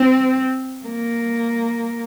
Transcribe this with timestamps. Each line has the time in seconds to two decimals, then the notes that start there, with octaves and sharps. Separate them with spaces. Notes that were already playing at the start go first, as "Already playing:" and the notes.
Already playing: C4
0.86 A#3